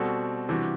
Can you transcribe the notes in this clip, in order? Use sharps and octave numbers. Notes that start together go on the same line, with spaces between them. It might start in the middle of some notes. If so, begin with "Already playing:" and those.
Already playing: B2 G3 C4 F#4 A4
C3 E3 G3 D4 F#4